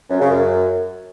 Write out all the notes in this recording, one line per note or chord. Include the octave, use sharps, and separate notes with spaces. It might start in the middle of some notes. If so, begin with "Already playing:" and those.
F#2
C#3
F#2